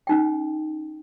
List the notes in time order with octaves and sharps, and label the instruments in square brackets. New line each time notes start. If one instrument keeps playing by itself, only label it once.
[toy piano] C#4 D#4 G5